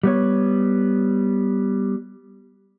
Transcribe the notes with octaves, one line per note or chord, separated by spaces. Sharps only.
G3 B3 C#5